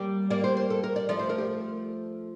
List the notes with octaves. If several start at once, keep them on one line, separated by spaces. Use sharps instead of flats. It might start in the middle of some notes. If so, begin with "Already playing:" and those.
Already playing: G3 A#3
G3 A#3 D5
C5
C5
A4
A#4
D5
F3 A3 D5
C5
A#4
G4